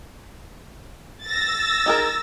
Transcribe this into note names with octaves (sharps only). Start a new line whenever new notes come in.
E6 A6 A#6
D#4 G#4 A#4